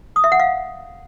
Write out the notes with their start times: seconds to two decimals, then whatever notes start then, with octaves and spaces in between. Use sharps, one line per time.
0.16 D#6
0.24 E5
0.32 F#5
0.40 F5